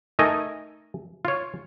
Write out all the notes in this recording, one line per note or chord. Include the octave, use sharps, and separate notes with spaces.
A3 D#4 A#4 D#5 G#5
F4 C#5